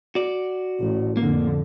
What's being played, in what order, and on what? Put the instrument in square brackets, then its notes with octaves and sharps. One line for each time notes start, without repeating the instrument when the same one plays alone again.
[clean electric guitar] F#4 D5
[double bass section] A1 A2
[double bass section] F2 D3 [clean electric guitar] A#3